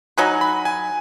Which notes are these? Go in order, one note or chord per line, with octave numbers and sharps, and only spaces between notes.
F#3 D#4 B4 G#5
B5
G#5